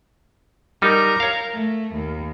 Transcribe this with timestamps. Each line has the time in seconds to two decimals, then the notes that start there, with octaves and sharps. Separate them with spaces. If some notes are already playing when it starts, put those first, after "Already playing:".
0.82 G3 D#4 A#4
1.20 C#5 F5
1.53 A3
1.96 D#2